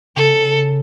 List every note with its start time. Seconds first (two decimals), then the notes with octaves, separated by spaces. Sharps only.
0.16 C#3 A4